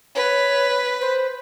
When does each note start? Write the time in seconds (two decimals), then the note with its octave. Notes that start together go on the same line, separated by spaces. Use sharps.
0.15 B4 C#5
1.01 C5